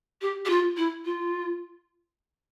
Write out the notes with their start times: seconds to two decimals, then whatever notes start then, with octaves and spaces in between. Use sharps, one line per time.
0.22 G4
0.45 G4
0.50 F4
0.77 E4
1.05 F4